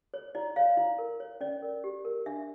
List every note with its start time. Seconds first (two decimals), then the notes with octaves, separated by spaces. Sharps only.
0.14 C#5
0.35 E4 D5
0.56 C#5 F5
0.77 E4
0.98 A#4
1.20 C#5
1.41 C#4 D5
1.62 A#4
1.84 G4
2.05 A#4
2.26 D4 E5